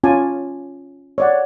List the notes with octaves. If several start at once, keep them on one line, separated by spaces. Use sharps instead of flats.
C#4 F4 G#5 A5 D6
C#5 D5 F#5